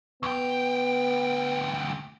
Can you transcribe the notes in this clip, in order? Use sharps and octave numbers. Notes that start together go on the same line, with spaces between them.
D2 B3 G5